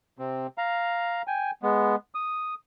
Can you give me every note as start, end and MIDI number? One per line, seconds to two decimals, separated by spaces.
0.19 0.47 48
0.19 0.47 60
0.58 1.22 77
0.58 1.22 82
1.27 1.51 79
1.27 1.51 80
1.63 1.95 56
1.63 1.95 59
2.15 2.54 87